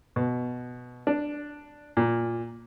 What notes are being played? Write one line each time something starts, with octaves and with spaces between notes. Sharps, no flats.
B2
D4
A#2